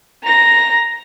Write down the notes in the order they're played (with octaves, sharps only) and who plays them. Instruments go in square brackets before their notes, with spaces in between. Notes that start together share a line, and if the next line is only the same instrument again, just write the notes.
[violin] A#5 A#6